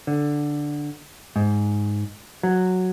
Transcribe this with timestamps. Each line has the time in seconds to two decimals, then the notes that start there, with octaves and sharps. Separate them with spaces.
0.07 D3
1.36 G#2
2.43 F#3